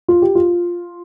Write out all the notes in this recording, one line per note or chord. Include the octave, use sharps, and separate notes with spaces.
F4
G4
F4